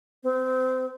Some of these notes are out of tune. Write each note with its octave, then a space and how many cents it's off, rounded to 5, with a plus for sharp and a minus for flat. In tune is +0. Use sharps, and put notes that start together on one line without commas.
C4 -25